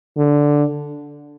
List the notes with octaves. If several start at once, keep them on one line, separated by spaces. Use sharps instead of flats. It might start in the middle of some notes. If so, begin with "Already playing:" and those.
D3